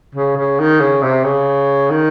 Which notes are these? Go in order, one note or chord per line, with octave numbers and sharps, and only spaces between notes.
C#3
C#3
D#3
C#3
C3
C#3
D#3